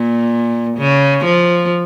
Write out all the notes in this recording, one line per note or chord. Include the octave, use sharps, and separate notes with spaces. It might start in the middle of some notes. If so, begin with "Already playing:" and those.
Already playing: A#2
C#3
F3